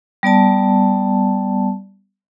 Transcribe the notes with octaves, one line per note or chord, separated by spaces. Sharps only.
G3 B3 D5 A5